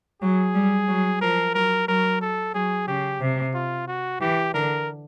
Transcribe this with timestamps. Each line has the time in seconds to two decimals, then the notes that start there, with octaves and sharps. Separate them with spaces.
0.22 F#3 G#4
0.55 G3
0.88 F#3
1.21 F3 A#4
1.54 F#3 A#4
1.87 F#3 A#4
2.21 A4
2.54 F#3 G#4
2.87 C#3 G4
3.21 C3
3.54 F4
3.87 F#4
4.21 E3 G4
4.54 D3 A#4